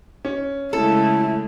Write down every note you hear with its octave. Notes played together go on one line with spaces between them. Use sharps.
C#4
C#3 G#3 A3 E4 A4